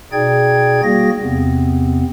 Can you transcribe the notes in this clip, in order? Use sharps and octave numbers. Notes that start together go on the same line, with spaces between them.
B2 D#4 G#4 D5 G5 G#6
G3 A#3 F#4 G#4 A#6
E2 C3 B3 C4